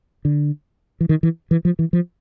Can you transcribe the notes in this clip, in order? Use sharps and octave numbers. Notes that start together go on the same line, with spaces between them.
D3
E3
D#3
E3
E3
F3
E3
F3